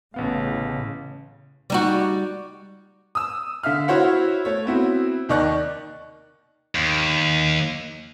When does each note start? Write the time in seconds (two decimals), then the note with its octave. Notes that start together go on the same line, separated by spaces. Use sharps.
0.14 A1 A2 C#3 B3 F5
1.70 G3 D#4 F#4
3.15 D#6 E6
3.63 D3 E5 F5 F6
3.88 E4 F#4 C5 C#5 F#5
4.45 A3 C#5
4.66 B3 C4 E4 F#4
5.29 D#2 D#3 D#4 D5 C#6 F#6
6.75 D#2